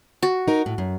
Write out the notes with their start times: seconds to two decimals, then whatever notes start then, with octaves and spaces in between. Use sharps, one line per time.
0.23 F#4
0.48 D#4 A#4
0.66 A2
0.78 F#2